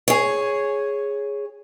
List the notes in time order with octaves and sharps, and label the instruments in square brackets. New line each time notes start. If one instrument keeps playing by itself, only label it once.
[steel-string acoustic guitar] G#4 C#5